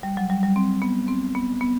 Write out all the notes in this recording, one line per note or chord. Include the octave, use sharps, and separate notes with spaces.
G3
F#3
G3
G3
C4
B3
C4
B3
B3